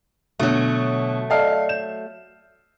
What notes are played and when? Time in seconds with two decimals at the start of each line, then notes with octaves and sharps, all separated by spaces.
0.40 B2 D3 F#3 A3
1.30 A4 D5 D#5 F5 A5
1.69 G6 E7